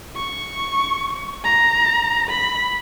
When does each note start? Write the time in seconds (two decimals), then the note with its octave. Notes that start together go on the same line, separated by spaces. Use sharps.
0.16 C#6
1.44 A#5
2.29 B5